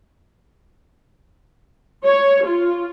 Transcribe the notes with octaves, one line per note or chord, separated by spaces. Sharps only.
C#5
F4